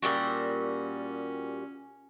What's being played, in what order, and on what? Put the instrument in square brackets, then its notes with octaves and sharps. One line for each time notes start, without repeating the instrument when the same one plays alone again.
[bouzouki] A#2 G3 F#4 [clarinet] C#4